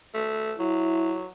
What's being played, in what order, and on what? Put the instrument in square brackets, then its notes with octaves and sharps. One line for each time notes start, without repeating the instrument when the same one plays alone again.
[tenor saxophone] A3
[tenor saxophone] F#3 [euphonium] E4